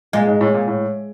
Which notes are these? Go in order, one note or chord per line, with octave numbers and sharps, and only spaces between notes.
A#2 G#3
G#2
A2
A#2
A2